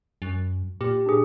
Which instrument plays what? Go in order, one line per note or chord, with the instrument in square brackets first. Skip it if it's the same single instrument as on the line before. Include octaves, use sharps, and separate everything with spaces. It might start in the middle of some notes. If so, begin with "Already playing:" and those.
[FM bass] F#2
[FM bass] A#2 [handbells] G4
[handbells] D4 G#4